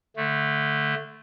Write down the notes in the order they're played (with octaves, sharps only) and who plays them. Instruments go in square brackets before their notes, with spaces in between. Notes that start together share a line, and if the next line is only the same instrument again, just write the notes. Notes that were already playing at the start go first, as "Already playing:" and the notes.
[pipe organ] D3 A3